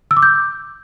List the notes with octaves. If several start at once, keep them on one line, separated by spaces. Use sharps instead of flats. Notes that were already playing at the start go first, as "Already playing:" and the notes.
E6
D6
G6